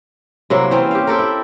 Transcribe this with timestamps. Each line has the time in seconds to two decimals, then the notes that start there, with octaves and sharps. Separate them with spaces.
0.50 C3 F#3 A#3 E4
0.71 E3 C4 C#4 C5
0.91 G4 F5
1.07 C4 G4 A4 A#4
1.19 E4